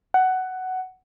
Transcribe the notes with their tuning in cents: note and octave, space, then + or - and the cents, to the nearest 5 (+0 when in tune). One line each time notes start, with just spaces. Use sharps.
F#5 +10